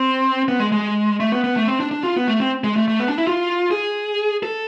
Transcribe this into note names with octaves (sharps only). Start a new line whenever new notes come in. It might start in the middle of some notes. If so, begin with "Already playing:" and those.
Already playing: C4
B3
G#3
G#3
A3
B3
B3
A3
C4
D4
D4
F4
B3
A3
C4
G#3
A3
A3
B3
D4
E4
F4
G#4
A4